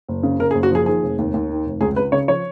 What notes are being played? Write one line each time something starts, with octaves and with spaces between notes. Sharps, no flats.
F#1
C#3
C#3 A#4
G#4
F#1
F#4
F3 G#4
D#3 G#4
F1
D#2
D#2
D#3
F1
C#2 G#4
C#2 B4
C#3 C#5
F3 C#5